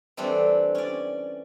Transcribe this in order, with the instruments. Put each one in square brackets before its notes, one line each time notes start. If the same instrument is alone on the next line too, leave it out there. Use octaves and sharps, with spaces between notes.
[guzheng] E3 G3 A3 C4 D4
C#4 D5